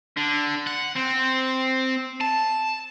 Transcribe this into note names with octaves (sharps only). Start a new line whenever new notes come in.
D3
F#5
C4
A5